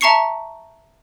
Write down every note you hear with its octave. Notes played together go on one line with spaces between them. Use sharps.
E5 A5 A#5 C#6 C7 C#7